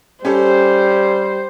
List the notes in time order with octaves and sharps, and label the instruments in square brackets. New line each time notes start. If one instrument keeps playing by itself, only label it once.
[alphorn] G3 [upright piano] C#4 G4 A4 [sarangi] C5